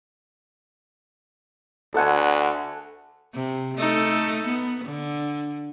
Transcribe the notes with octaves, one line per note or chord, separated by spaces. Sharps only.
D2 A4 F#5 G#5
C3
A3 D#4 A4
B3
D3